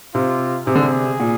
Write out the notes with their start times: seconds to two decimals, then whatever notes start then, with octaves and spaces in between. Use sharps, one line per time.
0.14 C3 F4
0.66 C3 G#4
0.75 D3
0.82 C3
1.20 A#2